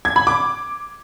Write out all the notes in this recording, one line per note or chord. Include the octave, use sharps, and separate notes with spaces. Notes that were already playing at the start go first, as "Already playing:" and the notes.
G#6
B5
D6